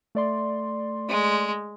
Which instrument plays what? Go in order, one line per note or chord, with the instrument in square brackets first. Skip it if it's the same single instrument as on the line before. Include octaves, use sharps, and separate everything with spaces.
[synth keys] A3 D5 C6
[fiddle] G#3